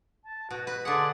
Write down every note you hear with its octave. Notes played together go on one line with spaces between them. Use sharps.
A5
B2 F#4
B4
D3 G#4 F#5 A5 C6 D6